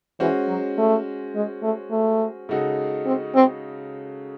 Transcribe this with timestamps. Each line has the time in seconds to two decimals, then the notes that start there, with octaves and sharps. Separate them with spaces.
0.19 E3 G#3 C#4 F#4 C5
0.48 F#3
0.78 A3
1.35 G#3
1.63 A3
1.91 A3
2.49 C#3 G#3 D#4 F#4 A4
3.06 C4
3.35 C4